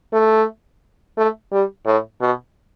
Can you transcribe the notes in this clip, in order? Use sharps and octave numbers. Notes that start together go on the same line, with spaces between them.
A3
A3
G3
A2
B2